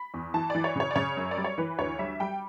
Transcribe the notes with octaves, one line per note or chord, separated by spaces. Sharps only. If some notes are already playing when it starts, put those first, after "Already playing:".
Already playing: B5
E2
E3 A5
E3 D5
C#5
C#3 C#5
D5
C#3 C#5
F#2
D5
G3
C#5
E3 B4
D2 C#5
G3 E5
G3 G5